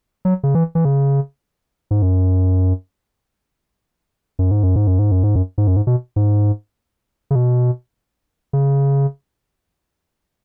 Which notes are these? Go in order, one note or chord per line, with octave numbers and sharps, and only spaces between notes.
F#3
C#3
E3
E3
C#3
G#2
F#2
F#2
G#2
F#2
G#2
F#2
G#2
F#2
G#2
F#2
G#2
F#2
G#2
B2
G#2
C#3
B2
C#3